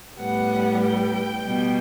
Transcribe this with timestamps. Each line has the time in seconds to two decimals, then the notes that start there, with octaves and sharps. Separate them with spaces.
0.20 A2 G3 B3 F#5
0.82 G5
1.44 B2 G3 B3